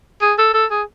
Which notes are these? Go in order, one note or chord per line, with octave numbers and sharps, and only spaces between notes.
G#4
A4
A4
G#4